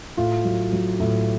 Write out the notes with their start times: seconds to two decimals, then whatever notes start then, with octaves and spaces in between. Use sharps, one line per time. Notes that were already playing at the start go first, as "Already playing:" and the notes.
0.17 A2 F4
0.45 F#3
0.72 F#3
1.00 A2